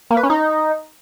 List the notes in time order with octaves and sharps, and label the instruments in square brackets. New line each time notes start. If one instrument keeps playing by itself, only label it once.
[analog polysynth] A#3
B4
C#4
D#4